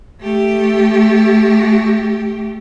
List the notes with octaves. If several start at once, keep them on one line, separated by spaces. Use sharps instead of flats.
A3 G4